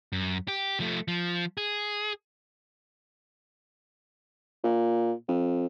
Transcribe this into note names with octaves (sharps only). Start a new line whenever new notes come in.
F#2
G4
F3 A3
F3
G#4
A#2
F2